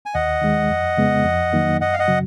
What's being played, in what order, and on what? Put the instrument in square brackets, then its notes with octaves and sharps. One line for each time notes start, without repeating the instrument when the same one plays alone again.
[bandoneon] G#5
[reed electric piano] D#2 [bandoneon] D#5 F#5
[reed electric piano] D#3 G#3
F2
C#3 G#3 B3
F2
D#3 F#3 A#3 D#4
[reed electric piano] F#2 [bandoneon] D#5 F#5
[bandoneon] F5
D#5 F#5
[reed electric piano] C#3 F#3